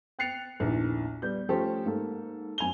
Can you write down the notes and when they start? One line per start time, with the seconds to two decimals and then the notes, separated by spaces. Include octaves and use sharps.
0.19 G5 F#6 A6 C7 C#7 F7
0.60 A#1 E2 D#3 E3
1.22 G3 B3 G6
1.49 F3 A3 C#4 G4 A4 C5
1.85 G#2 A#3 A4
2.58 F#2 G#5 F7 G7